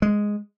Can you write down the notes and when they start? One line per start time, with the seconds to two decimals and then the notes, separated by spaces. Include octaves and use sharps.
0.02 G#3